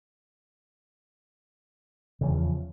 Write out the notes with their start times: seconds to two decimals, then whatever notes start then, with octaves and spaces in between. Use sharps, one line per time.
2.21 C#3
2.23 E3
2.26 F3
2.28 E2